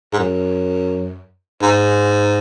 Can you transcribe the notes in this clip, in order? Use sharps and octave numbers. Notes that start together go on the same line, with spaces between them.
G#2
F#2
G#2